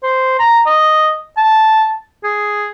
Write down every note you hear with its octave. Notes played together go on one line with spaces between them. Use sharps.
C5
A#5
D#5
A5
G#4